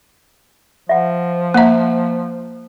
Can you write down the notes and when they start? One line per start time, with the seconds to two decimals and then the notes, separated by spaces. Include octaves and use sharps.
0.89 F3 E5 F#5
1.54 A#3 E5 F#5 A#5